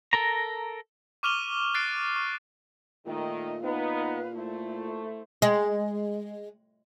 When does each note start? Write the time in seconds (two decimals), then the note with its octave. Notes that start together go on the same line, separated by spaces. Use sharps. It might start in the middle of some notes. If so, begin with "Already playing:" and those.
0.13 A4 A#4 A#5
1.23 C#6 D6 F6 D#7 F7 G7
1.74 F#6 A6 C7 D7 G7
2.16 C#6
3.06 A#2 D#3 A3 D#5
3.63 B3 D#4 B4 F5
4.35 A3 E4 C5
5.42 G#3